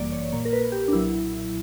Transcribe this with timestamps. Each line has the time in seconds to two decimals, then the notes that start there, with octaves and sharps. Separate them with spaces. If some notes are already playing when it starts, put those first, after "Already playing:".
Already playing: G1 F#2 E3 G3 A#3 D5
0.12 C#5
0.32 A#1 A#2 A#3 C#5
0.45 A#4
0.53 B4
0.72 G4
0.88 D4
0.93 B1 A#2 F#3 E4